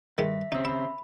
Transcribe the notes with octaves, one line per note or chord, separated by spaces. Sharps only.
G2 D#3 G#3 E5 B6
C#3 C4 D#4 E5 E6
E5 B5